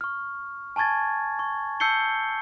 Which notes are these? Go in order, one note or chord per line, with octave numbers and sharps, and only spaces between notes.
C#6 F6
G#5 A5 C#6 G#6 A6
C#6
A5 E6 G6 C7 C#7 G7